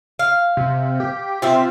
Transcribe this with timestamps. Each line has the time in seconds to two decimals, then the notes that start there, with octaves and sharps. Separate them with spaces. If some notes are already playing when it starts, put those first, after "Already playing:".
0.19 F5
0.57 C3
1.00 G4
1.42 C3 C4 F4 E5